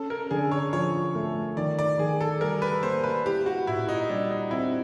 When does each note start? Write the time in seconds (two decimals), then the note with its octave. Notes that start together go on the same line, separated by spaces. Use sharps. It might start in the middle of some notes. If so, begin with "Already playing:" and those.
Already playing: C#4 A4
0.10 A#4
0.31 D3 G#4
0.51 C#5
0.73 F3 C#5
1.15 A3
1.57 D#3 D5
1.79 D5
1.99 D#3 G#4
2.21 A4
2.41 G3 A#4
2.62 B4
2.83 A#3 C5
3.04 B4
3.25 E4 G4
3.46 F#4
3.67 A#2 E4
3.89 D#4
4.09 G3 D4
4.31 D#4
4.51 C4 E4